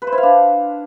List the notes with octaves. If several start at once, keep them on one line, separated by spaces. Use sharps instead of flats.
B4
C5
E4
F5
D4